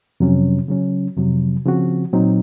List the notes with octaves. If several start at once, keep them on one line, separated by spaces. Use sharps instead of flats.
F2 C3 F#3 C#4
C#3 F#3 C#4
F2 C3 F#3
C#3 F3 C4 F#4
A#2 F#3 C4 D#4